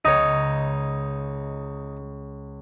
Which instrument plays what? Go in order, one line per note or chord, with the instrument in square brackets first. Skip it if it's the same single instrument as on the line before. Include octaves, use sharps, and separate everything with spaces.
[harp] C#2 [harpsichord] D#4 C#5